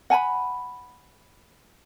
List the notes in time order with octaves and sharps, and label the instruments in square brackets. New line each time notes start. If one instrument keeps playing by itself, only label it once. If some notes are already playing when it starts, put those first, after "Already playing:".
[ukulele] F#5 G#5 A#5 B5